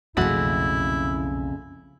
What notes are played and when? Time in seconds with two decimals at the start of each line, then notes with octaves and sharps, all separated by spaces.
0.17 B1 F2 A#2 C#3 A3 E4 F#4